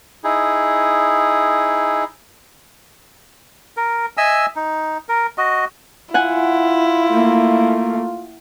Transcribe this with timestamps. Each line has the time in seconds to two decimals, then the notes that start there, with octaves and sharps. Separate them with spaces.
0.24 D#4 E4 G#4
3.77 A#4
4.17 D#5 E5 G#5 E6
4.56 D#4
5.09 A#4
5.38 F#4 D#5
6.14 E4 F4 F#5 G#5
7.10 A3 A#3